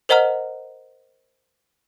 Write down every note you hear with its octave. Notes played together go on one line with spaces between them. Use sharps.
A#4 C5 D#5 F#5 A#5 F6